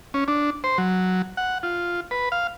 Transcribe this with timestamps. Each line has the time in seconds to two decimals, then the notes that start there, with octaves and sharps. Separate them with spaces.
0.14 C#4
0.28 D4
0.64 C5
0.78 F#3
1.37 F#5
1.63 F4
2.11 B4
2.32 F5